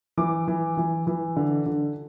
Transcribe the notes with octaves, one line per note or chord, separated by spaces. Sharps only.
E3 D6
E3
E3
E3
D3
D3